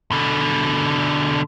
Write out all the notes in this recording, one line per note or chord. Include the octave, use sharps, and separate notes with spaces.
B2 D3